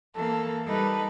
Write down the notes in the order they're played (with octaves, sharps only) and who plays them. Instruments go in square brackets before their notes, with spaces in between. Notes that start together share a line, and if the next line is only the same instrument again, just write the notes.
[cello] E3 A#3 [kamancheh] A4
[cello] G3 D#4 [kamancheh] A4 B4